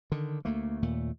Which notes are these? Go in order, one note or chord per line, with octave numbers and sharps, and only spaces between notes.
D3 D#3
D2 A3 A#3
D#2 A#2 A3